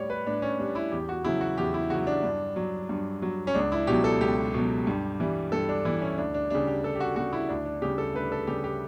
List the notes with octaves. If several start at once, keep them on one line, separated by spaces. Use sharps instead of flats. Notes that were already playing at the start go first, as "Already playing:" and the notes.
Already playing: A2 G3 C#5 D5
B4
A2 D4
C#4
G3 D4
E4
E2 G4
F#4
C#3 F#3 E4
F#4
E2 G4
E4
C#3 F#3 F#4
D4
G2
F#3
G2
F#3
C#4
C#2 D4
E4
B2 F#3 G4
A4
C#2 G4
B2 F#3
G2
E3 G3
G2 A4
D4
E3 G3 E4
C#4
D2 D4
D4
C#3 G3 D4
G4
D2 A4
G4
F#4
C#3 G3 F#4
E4
D2 D4
D4
C#3 G3 G4
A4
D2 B4
A4
C#3 G3 G4
G4